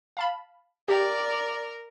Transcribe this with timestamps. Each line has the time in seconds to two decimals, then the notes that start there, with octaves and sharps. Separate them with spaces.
0.17 F5 A5 B5
0.88 G4 A#4 D5